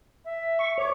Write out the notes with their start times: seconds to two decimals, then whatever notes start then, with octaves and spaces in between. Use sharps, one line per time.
0.24 E5
0.59 C#6
0.78 C#5 D6